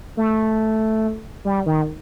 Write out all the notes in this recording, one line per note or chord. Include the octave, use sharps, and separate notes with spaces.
A3
G3
D#3